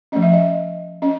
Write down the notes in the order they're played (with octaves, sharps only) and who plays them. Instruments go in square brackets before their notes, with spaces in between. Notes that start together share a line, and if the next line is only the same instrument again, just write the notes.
[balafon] F3 A3 C#4 D#5
E5
D#5
C#4 D#5